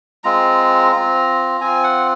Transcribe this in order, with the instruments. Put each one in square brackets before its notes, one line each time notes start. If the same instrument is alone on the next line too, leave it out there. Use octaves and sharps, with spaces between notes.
[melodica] G#3 C4 F4 A#5
C4 F4
C4 F4 G#5
F#5